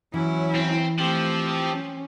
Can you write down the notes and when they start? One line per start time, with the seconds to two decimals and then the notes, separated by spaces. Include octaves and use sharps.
0.14 E3 F#3 C#4 E4 C#5
0.55 C4
0.99 F3 A3 C4 G4
1.71 C#4